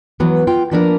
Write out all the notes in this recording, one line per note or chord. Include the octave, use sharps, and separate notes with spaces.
E3 F#3 B3
F4 G5
F3 A#3 B3 D4 A4 A#4